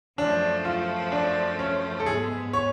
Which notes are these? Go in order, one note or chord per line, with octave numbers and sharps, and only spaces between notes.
F#2 F3 A3 D4
F4
D4
C#4
A4
G#2 G#3 B3 G#4
C#5